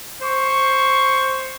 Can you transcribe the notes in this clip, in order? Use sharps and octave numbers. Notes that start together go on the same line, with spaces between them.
C5 C#6